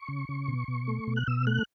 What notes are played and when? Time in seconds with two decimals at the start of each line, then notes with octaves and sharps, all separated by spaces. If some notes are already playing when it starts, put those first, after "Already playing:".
Already playing: C#6
0.08 C#3
0.29 C#3
0.48 B2
0.68 B2
0.88 A3
1.07 B2
1.16 F#6
1.27 B2 E6
1.47 A3 F#6